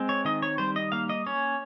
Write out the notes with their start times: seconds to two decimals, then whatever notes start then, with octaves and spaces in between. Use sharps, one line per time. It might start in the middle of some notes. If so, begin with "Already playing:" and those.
Already playing: G#3 C4
0.09 C#5
0.25 D#3 D#5
0.42 C#5
0.58 G3 C5
0.76 D#5
0.92 A#3 F5
1.09 D#5
1.26 C#4 C#5